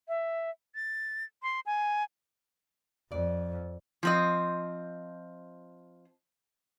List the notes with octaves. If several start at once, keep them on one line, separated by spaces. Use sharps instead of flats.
E5
A6
C6
G#5
F2 D5
F3 C4 D#5